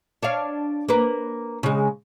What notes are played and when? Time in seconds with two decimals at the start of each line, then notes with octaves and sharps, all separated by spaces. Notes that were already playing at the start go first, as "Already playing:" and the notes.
0.23 D4 C#5 F5
0.88 A#3 B4
1.63 C#3 G#3